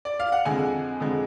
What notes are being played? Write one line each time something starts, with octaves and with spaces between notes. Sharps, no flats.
D5
F5
F#5
F2 D3 G#3 G#5
F2 D3 G#3